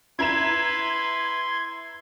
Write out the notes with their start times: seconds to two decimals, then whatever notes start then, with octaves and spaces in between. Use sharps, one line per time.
0.19 E4 B4 A#5 C6 G#6 E7